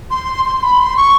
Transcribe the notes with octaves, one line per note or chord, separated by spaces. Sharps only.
C6
C6
B5
C6
C#6